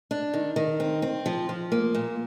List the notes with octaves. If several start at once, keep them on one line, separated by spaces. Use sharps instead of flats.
D4
D#3
D#3
C4
C4
F3
F3
A#3
A#2